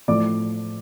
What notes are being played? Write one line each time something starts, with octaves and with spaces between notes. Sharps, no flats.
A2 F3 A3 D5 D6